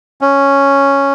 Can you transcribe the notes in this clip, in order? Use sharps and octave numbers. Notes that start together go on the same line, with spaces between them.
C#4